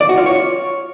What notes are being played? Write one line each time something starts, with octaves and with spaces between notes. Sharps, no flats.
D5
F#4
F4
C#5